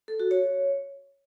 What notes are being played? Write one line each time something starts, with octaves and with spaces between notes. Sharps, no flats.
A4
F#4
C#5